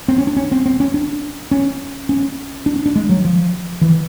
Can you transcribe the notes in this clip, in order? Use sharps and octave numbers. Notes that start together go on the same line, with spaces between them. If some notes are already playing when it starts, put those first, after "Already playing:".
C4
C#4
D4
C#4
C4
C4
C#4
D4
C#4
C#4
D4
C#4
D4
G#3
F#3
F3
E3